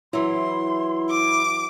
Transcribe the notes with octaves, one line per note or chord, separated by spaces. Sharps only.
E3 F#3 E4 C6
D6